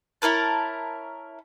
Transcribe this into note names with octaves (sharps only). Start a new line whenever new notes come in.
C#4 E4 A#4 A5